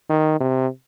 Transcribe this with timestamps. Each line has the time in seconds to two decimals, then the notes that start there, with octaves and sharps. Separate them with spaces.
0.10 D#3
0.40 C3